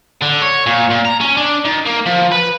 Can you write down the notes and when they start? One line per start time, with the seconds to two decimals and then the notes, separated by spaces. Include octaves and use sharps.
0.22 D3
0.42 C#5
0.66 A#2
0.91 A#2
1.05 A#5
1.21 C#4
1.37 D4
1.65 D#3
1.86 A#3
2.06 F3
2.32 B4